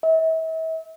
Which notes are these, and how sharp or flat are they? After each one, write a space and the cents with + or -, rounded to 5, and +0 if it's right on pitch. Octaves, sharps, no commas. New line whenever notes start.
E5 -40